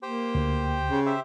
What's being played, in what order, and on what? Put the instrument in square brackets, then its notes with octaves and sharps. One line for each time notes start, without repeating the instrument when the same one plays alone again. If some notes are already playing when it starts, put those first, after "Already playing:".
[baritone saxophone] A#3 [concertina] G4 C5 G5
[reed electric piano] D2
[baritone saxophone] C#3
[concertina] G4 C5 E5